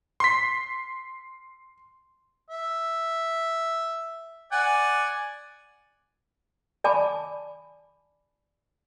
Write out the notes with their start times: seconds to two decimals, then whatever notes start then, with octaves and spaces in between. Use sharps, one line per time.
0.20 C6 B6
2.50 E5
4.52 D5 F#5 G#5
6.84 D5 G#5 A5 B5 D6